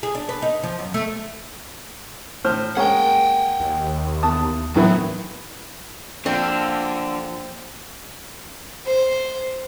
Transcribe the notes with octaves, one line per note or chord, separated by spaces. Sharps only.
G#4
D4
B4
D#4
F3
F#2
A3
A2 C5 F6
G#3 A#3 C#4 F#5 G5
D#2
E2 A5 D#6
A2 D#3 E3 F#3 B3
D3 F3 A#3 C4 F4 D5
C5